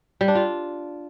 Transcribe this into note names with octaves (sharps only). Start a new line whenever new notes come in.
G3
D4
F4